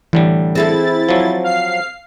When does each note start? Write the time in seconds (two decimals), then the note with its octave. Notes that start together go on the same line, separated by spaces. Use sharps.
0.13 A2 D3 E3 G3
0.55 C4 E4 G#4 A4 A6
1.09 F3 F#3
1.44 F5 C7